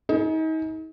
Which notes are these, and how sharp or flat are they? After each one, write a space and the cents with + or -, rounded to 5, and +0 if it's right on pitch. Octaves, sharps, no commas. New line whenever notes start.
D#4 +35 G#4 +30